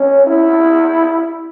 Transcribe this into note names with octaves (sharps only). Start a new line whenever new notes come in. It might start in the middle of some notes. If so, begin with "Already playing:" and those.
Already playing: C#4
E4